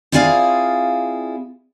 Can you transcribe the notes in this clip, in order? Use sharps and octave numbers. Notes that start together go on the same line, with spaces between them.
C4 E4 F4 G#4 D5 F5